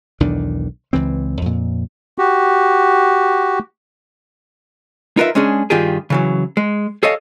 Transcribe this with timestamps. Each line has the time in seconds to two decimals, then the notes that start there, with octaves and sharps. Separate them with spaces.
0.20 B1 E2 D#3 D4
0.93 C#2 E3 C4
1.42 F2 A#2
2.18 F#4 G4
5.17 D#4 F4 A#4 B4 C#5 E5
5.35 G#3 C#4 D4 G#4
5.70 G2 D#3 F4 G4 G#4
6.10 C#3 E3 F#3
6.57 G#3
7.03 G#4 A4 C#5 D#5 F5